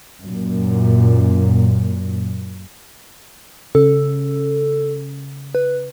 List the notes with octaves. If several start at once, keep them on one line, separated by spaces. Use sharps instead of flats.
F#2 A#2
C#3 A4
B4